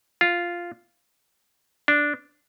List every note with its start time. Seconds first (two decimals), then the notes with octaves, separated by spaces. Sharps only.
0.21 F4
1.88 D4